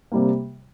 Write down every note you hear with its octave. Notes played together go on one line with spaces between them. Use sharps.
C3 G3 A#3